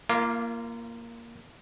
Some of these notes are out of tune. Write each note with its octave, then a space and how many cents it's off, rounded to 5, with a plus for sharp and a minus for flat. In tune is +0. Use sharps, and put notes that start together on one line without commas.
A#3 +0 F4 -35